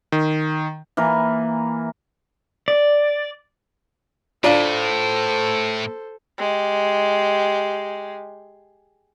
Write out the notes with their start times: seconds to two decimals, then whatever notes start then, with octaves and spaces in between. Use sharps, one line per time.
0.12 D#3
0.97 E3 A#3 A#4 G#5
2.68 D5
4.44 A2 D4 F4 A4 C5 F5
6.38 G#3 G4